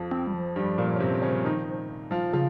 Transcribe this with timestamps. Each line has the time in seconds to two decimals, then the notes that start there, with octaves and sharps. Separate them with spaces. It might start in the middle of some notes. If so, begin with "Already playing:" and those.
Already playing: F2 F3
0.11 C4
0.27 G3
0.34 F3
0.56 G2 G3
0.78 A#2 A#3
0.96 C#4
1.00 C3 C4
1.22 C#3 C#4
1.45 D#3 D#4
2.11 F3 F4
2.33 C#3 F3 F4